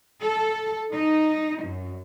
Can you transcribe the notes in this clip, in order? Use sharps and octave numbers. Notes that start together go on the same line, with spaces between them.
A4
D#4
F#2